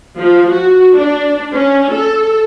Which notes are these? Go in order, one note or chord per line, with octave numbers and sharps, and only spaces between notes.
F3
F#4
D4
C#4
A4